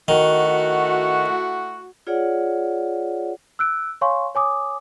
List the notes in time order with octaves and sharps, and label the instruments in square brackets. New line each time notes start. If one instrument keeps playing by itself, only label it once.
[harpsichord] D#3 [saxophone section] A3 E4 F#4
[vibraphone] F4 G#4 C#5 D5 F#5
[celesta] E6 F#6 D7
C#5 F5 G#5 C6 C#6
C#5 G#5 D6 D#6